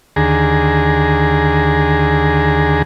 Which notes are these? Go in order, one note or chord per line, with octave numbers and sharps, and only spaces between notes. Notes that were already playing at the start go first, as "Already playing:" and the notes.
D#2 D3 G#4 A#5